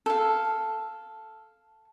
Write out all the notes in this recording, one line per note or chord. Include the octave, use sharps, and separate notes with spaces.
A4 F5